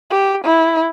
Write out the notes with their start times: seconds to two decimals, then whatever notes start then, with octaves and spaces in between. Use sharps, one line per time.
0.10 G4
0.45 E4